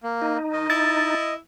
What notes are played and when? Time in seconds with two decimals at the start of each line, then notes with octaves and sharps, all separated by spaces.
0.03 A#3
0.22 D#4
0.53 D#3 D#5
0.70 E4 A6